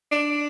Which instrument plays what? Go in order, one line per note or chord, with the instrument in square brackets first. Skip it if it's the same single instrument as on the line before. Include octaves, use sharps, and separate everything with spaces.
[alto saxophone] D4